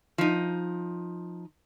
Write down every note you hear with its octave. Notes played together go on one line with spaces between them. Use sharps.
F3 D#4